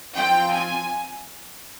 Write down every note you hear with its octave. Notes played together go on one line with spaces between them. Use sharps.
F3 C4 F4 G5
G#5